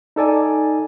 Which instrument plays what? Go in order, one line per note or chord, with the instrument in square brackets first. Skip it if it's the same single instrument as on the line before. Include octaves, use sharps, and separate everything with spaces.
[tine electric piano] D#4 A4 D5 G#5